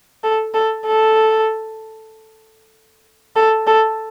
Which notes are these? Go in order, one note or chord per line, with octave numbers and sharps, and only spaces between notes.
A4
A4
A4
A4
A4